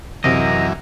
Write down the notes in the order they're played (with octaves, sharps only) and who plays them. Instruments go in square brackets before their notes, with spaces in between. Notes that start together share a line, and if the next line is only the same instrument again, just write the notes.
[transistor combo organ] F#2 E3 [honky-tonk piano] C3 [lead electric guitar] A#4 D#5